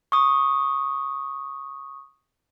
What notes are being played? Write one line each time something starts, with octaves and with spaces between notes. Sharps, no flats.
C#6 D#6